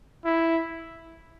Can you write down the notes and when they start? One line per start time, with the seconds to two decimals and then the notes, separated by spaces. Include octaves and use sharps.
0.25 E4